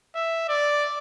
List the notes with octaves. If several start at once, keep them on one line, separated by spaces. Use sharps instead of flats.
E5
D5